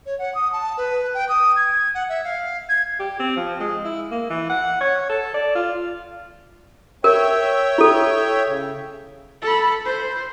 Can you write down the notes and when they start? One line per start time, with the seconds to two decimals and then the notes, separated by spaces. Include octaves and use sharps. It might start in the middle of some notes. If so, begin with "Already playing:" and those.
0.06 C#5
0.19 F#5
0.35 D#6
0.53 A5
0.77 B4
1.14 G5
1.29 D#6
1.56 G#6
1.94 F#5
2.09 E5
2.24 F5
2.69 G#6
2.99 G4
3.20 C4
3.36 F3
3.60 G#3
3.85 E4
4.11 A#3
4.30 E3
4.49 F#5
4.81 C#5
5.09 A4
5.34 D5
5.55 F4
7.04 A#4 C#5 E5 G5
7.78 E4 A4
8.47 C#3
9.42 A4 B5
9.85 C5